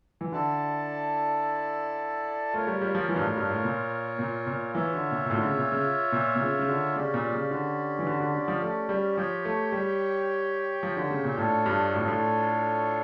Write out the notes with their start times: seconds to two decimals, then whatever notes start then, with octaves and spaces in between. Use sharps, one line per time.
0.21 E3
0.32 D3 E4 A4 D5 A5
2.53 A3 F4 A#4 C#5
2.67 G3
2.81 G3
2.95 F3
3.09 E3
3.16 G2
3.23 A2
3.37 G2
3.50 A2
3.64 A#2
4.19 A#2
4.47 A#2
4.75 E3 F4 C#5 E5
4.93 D3
5.11 A#2
5.25 A#2
5.30 A2
5.37 D3
5.44 C#3
5.58 A#2
5.72 C#3
6.12 A#2
6.36 A#2
6.41 C#3
6.59 C#3
6.69 D3
6.96 C#3 C#4 G4 D5
7.14 A#2
7.33 C#3
7.51 D3
7.99 E3
8.07 D3
8.20 D3
8.34 D3
8.48 F3
8.62 A3
8.89 G3
9.17 F3 G4 C#5 G5
9.45 A3
9.72 G3
10.83 F3
10.97 D3
11.11 C#3
11.25 A#2
11.37 A2 D4 F4 A4 C#5
11.66 G2
11.94 A2
12.00 G2
12.08 A2